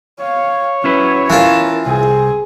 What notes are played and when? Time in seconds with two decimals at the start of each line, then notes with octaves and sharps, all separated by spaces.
0.20 C#5 F5
0.84 F#3 C#4 E4 B4
1.30 E3 F4 A#4 A5
1.86 C2 C4 G#4